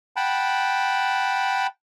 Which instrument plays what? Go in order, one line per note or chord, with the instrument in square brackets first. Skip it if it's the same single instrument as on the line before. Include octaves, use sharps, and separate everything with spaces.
[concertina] F#5 G5 A5 B5